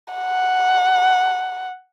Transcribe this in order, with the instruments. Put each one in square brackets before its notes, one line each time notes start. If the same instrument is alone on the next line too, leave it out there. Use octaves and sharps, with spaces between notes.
[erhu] F#5